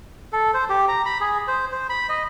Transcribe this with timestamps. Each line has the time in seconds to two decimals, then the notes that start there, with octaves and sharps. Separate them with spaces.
0.33 A4
0.54 C5
0.69 G4
0.88 A#5
1.06 B5
1.21 G#4
1.48 C5
1.72 C5
1.89 B5
2.09 D#5